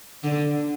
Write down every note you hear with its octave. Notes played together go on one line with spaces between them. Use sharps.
D3